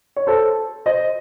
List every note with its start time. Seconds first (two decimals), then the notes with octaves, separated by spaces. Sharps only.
0.16 C#5
0.27 A4 C5
0.86 C5 D#5